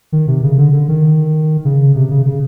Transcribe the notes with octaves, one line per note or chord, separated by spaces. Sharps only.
D#3
C3
C#3
D3
D3
D#3
C#3
C3
C#3
C#3